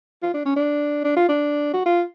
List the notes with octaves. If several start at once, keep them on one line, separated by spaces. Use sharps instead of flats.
F4
D4
C#4
D4
D4
F4
D4
F#4
F4